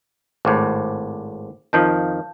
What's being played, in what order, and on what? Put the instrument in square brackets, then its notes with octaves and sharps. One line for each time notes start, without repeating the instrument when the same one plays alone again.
[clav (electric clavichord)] G#1 A2 [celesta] C5 D6
[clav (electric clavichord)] F2 D#3 F3 [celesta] F5 A5 G6